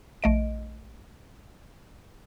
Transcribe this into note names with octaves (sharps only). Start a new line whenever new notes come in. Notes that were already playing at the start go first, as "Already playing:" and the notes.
A#1 A3 D#5 D7